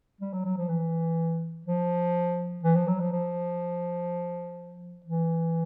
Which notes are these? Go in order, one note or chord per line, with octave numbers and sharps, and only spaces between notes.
G3
F#3
F#3
F3
E3
F3
E3
F3
F#3
F3
F3
E3